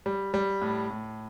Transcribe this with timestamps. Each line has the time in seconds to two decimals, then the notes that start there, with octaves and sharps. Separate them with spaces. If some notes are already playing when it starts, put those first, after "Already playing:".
0.06 G3
0.34 G3
0.61 A2
0.90 A2